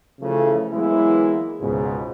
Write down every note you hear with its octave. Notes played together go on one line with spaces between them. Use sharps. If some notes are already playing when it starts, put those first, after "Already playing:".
C#3 E3 F3 A3
E3 F#3 G#3 A#3 B3 E4
C#2 G#2 B2